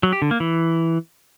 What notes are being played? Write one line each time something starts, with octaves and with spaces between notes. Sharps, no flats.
F#3
G4
D3
A#3
E3